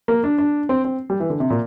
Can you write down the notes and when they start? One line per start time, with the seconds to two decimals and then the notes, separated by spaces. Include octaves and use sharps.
0.08 A#3
0.24 D4
0.38 D4
0.69 C4
0.85 C4
1.10 G3
1.20 E3
1.30 D3
1.40 C3
1.50 A#2